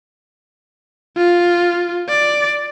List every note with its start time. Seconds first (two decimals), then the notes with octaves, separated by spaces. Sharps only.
1.17 F4
2.09 D5